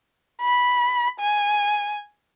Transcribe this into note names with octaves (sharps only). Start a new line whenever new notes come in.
B5
G#5